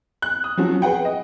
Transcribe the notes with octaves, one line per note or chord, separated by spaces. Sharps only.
F#6
D#6
F3 F#3 C#4 F#4
G#4 B4 F#5 G5
D#5